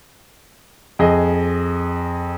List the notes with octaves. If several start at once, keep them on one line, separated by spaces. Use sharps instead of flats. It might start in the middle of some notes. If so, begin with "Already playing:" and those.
F2 G#4 D#5